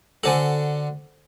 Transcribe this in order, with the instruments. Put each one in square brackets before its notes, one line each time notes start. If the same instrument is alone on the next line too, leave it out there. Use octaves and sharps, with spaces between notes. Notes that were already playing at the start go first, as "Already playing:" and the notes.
[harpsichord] D3 D4 F#4 [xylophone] A4 C5 G#5